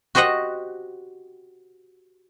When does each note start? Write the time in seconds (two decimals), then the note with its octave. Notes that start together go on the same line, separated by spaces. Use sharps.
0.15 F#4 G4 C5 D#5 F#5